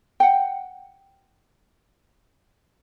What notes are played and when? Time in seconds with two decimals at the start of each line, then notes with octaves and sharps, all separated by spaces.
0.20 F#5 G5